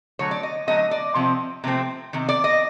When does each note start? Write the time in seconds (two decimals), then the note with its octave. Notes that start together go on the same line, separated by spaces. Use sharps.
0.19 D3 F#3 A3 C#5
0.31 D5
0.43 D#5
0.67 D3 F#3 A3 D#5
0.91 D5
1.15 C3 F3 C4
1.64 C3 F3 A3 C4
2.13 C3 D#3
2.29 D5
2.44 D#5